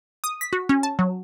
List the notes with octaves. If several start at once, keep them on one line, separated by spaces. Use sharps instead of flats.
D#6
B6
F#4
C#4
A5
F#3